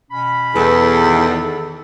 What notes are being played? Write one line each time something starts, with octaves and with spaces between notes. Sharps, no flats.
B2 C#4 B5
E2 A4 B4 A5
D#3